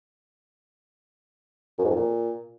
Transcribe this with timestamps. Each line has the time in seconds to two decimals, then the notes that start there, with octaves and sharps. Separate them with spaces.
1.79 F#2
1.84 G#2
1.90 F2
1.95 A#2